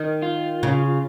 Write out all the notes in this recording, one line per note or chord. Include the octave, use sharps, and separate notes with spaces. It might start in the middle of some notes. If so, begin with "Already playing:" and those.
Already playing: D#3
F4
C#3